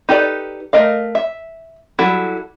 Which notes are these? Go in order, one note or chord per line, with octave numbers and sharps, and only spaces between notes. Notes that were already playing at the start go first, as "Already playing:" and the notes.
D#4 G4 A4 B4 D5
A3 A#4 D#5 F5
E5
F#3 G3 E4 F#4 A4